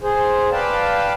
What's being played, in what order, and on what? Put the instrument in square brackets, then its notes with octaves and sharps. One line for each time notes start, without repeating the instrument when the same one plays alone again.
[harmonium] G#4 C5
B4 D5 F5 G5 A5